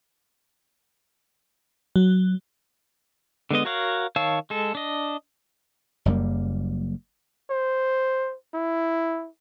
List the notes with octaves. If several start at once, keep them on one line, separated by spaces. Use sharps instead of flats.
F#3
D3 G#3 B3 D#5
F#4 A#4 C#5 F5 F#5
D#3 C#5 F5 A5 E6
G#3 A4
D4 D#5
F#1 F#2 G3 A#3
C5
E4